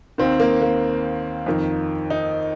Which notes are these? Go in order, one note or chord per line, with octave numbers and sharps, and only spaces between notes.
D#2 D#3 C4
A#3
A#3
F2 D#3
D#4